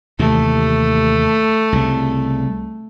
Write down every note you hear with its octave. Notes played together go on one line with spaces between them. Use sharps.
D#2 C3 E3 A3
C2 C#3